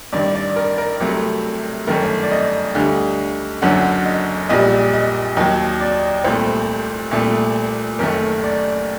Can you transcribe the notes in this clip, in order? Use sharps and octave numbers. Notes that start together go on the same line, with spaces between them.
A1 G2 D#3 D5
D5
A#4
A#4
C2 C3 F#3 A3
G1 F#2 D#3 A3 A#4
D5
D#5
D2 D3 G3
F#1 F#2 D3 F#3 F#5
D#5
A#1 A#2 G3 D#5
D#5
D#2 D#3 F#3 D#5
D5
C2 A#2 A3 C5
C2 A#2 A3
F#1 F#2 D#3 A3 A#4
D5